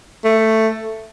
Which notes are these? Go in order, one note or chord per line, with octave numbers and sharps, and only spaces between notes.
A3